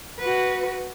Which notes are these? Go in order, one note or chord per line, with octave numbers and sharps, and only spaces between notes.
F#4 B4